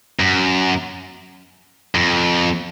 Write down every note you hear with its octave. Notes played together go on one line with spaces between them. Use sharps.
F#2
F2